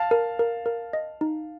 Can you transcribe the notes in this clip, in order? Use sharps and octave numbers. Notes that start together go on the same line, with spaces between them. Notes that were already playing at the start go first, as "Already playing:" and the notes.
Already playing: F5 A5
A#4
A#4
A#4
D#5
D#4